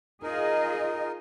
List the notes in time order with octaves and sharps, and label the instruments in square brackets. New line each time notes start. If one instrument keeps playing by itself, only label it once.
[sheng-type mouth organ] D#4 A#4 [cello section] F4 G#4 D#5